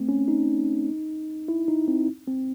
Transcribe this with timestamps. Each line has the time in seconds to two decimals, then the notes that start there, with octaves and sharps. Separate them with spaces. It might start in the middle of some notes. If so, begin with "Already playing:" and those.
Already playing: A3 C4
0.09 C#4
0.28 D#4
1.48 E4
1.68 D#4
1.88 C4
2.28 C4